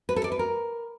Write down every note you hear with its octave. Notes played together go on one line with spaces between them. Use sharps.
B4
A4
D5
B4
A#4